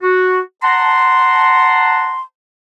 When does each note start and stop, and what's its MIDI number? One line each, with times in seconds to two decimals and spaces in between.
0.02 0.40 66
0.63 2.22 78
0.63 2.22 81
0.63 2.22 82
0.63 2.22 84